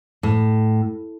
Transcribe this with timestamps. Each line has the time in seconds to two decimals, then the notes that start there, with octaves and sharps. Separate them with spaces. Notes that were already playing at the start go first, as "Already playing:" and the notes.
0.23 A2